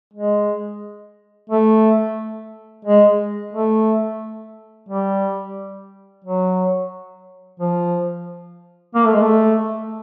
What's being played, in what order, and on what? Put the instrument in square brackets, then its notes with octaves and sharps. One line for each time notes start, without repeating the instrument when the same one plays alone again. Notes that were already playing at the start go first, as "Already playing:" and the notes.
[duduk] G#3
A3
G#3
A3
G3
F#3
F3
A#3
A3
G#3
A3